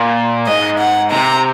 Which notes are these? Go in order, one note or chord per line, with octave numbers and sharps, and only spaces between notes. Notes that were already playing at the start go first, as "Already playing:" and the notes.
Already playing: A#2
G#2 D#5
F#5
C3 A#5